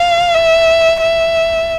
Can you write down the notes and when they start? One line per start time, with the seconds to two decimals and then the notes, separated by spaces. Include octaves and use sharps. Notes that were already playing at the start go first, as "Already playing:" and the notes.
Already playing: F5
0.34 E5
1.01 E5